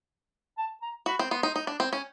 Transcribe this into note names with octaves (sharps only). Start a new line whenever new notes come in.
A5
A#5
F#4 B5
C4
B3 C6
D#4
D#4
D4
C4
C#4